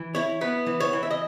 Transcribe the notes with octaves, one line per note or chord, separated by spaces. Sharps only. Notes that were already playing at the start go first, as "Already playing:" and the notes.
Already playing: E3
E4 C#5
B3 B4
E3
C#5
E3
E5
D#5